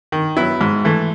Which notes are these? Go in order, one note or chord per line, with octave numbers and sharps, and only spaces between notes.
D#3
F#3 B3 E4
G#2
E3 A3